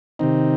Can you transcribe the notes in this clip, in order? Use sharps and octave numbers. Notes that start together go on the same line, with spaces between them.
C3 D#3 C4 D#4